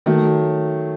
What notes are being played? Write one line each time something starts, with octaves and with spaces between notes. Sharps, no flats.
D#3 F#3 A3